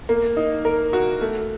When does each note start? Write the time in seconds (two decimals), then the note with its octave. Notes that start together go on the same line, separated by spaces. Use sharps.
0.09 A#3
0.37 D#4
0.65 A#4
0.93 F#4
1.21 A3